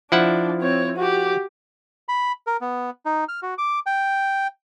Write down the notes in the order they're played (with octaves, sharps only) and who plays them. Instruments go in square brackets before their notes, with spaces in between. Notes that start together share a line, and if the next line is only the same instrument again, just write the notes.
[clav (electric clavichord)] F3 E4 F#5 [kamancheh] D4
[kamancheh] C4 C#5
F#4 G4
[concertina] B5
A#4
B3
D#4
F6
F#4
D6
G5